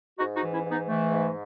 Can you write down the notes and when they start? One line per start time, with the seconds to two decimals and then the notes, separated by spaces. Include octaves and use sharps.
0.18 G#2 D#4 F#4
0.35 D#4 F#4
0.42 E3
0.54 C#4 E4
0.65 G#2
0.71 B3 D#4
0.88 E3 A3
1.11 G#2